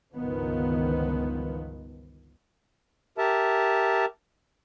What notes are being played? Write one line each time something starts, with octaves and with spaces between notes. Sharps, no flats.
G1 C#2 D#3 F3 B3
G4 A#4 E5 A5